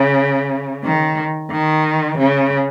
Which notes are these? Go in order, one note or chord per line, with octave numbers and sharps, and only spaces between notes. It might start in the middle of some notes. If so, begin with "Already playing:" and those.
Already playing: C#3
D#3
D#3
C#3